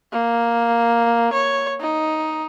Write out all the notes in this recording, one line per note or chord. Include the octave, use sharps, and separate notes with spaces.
A#3
C#5
D#4